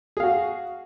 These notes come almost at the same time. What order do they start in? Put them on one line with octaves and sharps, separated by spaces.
G#4 F5 F#4